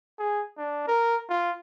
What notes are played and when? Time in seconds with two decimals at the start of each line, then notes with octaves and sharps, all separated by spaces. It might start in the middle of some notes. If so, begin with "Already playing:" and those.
0.19 G#4
0.57 D4
0.87 A#4
1.29 F4